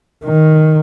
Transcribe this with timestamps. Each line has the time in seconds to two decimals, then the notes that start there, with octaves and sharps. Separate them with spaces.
0.24 D#3